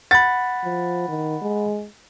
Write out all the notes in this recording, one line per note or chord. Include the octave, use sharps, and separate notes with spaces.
F#5 B5 A6
F3
D#3
G#3